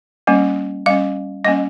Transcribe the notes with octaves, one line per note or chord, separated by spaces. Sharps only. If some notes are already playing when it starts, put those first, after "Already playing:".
G3 A#3 C#4
G3 C#4 F5
G3 A#3 C#4 D#5